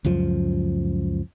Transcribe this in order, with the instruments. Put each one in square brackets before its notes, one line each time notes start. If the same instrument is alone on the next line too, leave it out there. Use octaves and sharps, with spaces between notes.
[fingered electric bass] C#2 F#2 F3